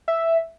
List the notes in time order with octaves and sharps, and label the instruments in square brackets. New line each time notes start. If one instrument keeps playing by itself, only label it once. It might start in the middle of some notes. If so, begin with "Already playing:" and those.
[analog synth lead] E5